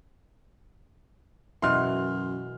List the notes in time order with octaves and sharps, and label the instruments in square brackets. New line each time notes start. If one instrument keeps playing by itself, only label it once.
[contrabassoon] F#2 [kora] B2 E3 [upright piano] C6 F6